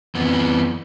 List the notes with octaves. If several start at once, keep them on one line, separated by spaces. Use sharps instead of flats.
F2 B3